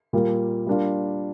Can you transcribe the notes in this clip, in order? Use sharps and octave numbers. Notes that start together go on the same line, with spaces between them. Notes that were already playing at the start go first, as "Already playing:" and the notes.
A#2 G3 A#3
G3 A#3 D4 F4